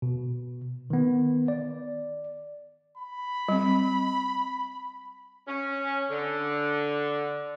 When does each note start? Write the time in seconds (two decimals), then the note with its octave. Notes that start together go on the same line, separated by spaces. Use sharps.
0.02 B2
0.90 D#3 B3
1.48 D5
2.97 B5
3.48 G3 C4
5.48 C#4
6.11 D3